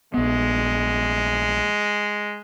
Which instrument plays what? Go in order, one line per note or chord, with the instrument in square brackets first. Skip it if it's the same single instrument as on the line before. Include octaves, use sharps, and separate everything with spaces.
[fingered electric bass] A#1 B3 [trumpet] G#3